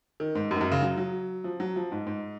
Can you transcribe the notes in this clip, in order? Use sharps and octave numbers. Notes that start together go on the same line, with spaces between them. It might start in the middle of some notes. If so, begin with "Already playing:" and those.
D#3
G#2
F#2
G#2
F#2
C#3
F#3
F#3
F3
F#3
F3
G#2
G#2